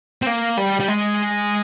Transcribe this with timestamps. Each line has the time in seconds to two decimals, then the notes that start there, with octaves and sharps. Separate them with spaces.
0.22 C4
0.26 A#3
0.57 G3
0.80 G3
0.88 G#3